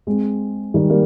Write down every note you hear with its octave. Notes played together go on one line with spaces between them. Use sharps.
G#3 C4
D#3 G3
G3 A#3